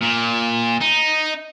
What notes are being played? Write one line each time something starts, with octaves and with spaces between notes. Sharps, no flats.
A#2
D#4